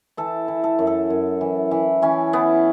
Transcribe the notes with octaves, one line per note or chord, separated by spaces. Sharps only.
E3 A4
E3
A4
F#2
A4
F#2
E3
E3
E3 C#4
E3 B3